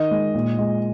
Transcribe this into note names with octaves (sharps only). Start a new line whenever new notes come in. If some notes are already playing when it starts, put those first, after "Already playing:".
Already playing: D#3 D#5
G#3
A#2
G#3